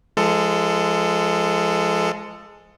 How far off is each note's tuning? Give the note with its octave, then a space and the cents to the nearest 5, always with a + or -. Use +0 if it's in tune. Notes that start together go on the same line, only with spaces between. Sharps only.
F3 -30 G#3 +0 A4 +15